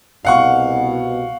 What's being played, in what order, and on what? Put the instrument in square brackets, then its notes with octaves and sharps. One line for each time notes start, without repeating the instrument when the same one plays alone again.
[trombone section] C2 B2 [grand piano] F5 F#5 C#6